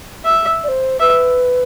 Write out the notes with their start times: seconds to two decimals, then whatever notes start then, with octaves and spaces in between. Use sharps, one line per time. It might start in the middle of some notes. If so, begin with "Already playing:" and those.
0.25 E5
0.63 D5
0.68 C5
1.00 B4 E5